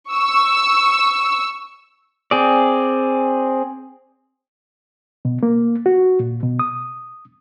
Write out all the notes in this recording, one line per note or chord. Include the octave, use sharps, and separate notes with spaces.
C#6 E6
C4 G#4 D5
B2
A#3
F#4
A#2
B2
D#6